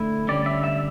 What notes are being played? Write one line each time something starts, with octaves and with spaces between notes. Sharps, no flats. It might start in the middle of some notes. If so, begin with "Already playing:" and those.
Already playing: D3 A3 E4
D3 G3 C#4 D5
E5
E5